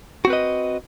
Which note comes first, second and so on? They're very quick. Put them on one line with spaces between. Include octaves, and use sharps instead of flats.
F#4 C4 B4 D#5